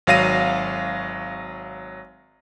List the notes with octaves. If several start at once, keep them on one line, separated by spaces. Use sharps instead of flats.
G#1 F#3 F5 A#6 D#7